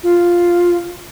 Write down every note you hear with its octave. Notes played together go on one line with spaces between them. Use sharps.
F4